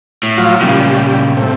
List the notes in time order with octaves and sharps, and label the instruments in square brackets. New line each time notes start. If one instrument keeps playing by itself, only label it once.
[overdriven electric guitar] A2
[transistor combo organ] F3 F#3 F4
[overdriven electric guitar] A#2 C#3 [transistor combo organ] G3
[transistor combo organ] A2 C3